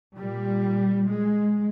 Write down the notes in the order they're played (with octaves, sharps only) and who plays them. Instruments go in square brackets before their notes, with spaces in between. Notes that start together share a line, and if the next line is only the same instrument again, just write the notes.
[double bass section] A#2 G3
G#3